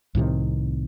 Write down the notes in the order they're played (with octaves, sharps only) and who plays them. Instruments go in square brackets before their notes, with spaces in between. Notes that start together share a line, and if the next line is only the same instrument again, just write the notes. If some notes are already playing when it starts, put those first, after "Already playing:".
[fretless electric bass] C2 A2 C3 D#3